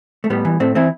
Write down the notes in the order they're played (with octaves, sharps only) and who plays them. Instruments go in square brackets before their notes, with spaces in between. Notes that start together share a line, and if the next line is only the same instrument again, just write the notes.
[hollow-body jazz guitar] A3
A2 G3 B3
E3
A2 A3 C4
E3 C4 E4